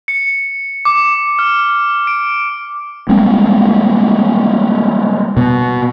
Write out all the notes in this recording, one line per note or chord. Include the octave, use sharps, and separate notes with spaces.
C#7
D6
F6
D7
G3 G#3 A#3 C4
B2 B3